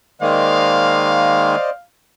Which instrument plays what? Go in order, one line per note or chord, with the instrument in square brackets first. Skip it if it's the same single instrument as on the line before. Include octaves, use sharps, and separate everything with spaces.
[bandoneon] D#3 G#3 A#3 [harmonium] C5 D5 D#5 [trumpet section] F5